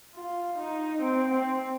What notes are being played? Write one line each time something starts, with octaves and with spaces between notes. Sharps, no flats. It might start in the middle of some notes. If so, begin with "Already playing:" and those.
F4
D#4
C4
C4